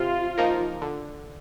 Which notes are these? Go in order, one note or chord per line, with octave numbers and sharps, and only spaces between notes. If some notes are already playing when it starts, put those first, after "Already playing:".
Already playing: C3 F4
F3 A#3 D#4 A#4
D3